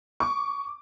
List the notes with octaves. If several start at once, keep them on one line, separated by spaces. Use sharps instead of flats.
C#6 D6